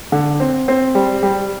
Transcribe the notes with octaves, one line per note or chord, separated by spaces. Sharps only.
D3
C4
C4
G3
G3